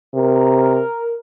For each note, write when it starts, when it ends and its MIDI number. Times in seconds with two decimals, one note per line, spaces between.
0.15 0.81 48
0.15 1.15 70